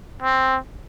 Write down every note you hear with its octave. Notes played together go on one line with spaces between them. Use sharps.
C4